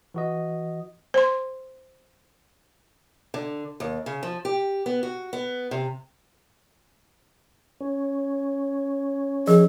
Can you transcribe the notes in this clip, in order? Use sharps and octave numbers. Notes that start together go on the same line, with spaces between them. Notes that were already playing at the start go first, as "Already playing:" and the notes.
E3 F#4 D#5
C5 C6
D3
D#2
C#3
F3
G4
B3
F#4
B3
C3
C#4
F3 G#4